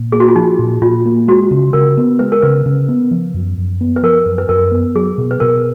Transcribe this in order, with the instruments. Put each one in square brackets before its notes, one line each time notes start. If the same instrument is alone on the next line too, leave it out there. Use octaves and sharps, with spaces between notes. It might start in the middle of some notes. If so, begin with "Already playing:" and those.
Already playing: [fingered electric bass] A#2
[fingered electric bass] A#3 [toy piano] G#4
[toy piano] F#4
F4
[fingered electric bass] F3 [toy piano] D#4
[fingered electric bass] A#2
[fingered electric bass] A#2 [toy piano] F4
[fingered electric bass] A#3
[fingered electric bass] G#3 [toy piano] F#4
[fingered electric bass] C#3
[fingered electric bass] C#3 [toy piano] A#4
[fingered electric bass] B3
[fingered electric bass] G#3 [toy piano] B4
[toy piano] A#4
[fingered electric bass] C#3 [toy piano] B4
[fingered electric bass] C#3
B3
F3
F#2
F#2
B3
[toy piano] B4
[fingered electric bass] F3 [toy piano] A#4
[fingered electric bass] F#2
[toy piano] B4
[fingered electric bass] F#2 [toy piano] A#4
[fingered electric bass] B3
[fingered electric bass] F#3 [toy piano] G#4
[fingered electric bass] B2
[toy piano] B4
[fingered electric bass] B2 [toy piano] A#4